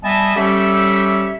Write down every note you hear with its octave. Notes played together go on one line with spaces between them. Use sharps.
G3 B3 D#5 E5 G#5 A5
G3 C#4 G4 A4 C#5 E5